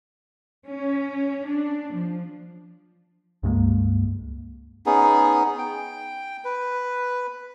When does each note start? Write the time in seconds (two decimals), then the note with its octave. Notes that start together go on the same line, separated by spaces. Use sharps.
0.67 C#4
1.46 D4
1.94 F3
3.43 C#2 G2 G#3 A#3
4.86 B3 C#4 D#4 G#4
5.58 G5
6.44 B4